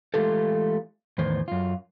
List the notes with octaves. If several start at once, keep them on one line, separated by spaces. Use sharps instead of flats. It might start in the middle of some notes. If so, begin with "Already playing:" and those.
E3 G#3 A3 F4 G4 A4
E2 A2 D#3 C5
F#2 F4